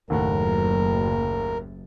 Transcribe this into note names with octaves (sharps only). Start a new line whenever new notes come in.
F#1 D#2 A2 A#4 F#5